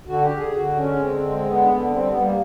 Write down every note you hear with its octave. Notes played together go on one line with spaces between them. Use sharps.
D3 F#4
G4
D3
G#4
D3 F#4
G#3 C#4
D3 C4
G#3
D3 B3
D3
B3
G3 C4
B3
G3
A#3